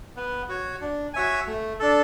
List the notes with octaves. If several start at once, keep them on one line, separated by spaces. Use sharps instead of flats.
B3
F#4 C#5
D4
F#4 C#5 E5 G#5
A3
D4 A4